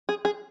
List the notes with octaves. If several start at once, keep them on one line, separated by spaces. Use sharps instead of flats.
G#4
G#4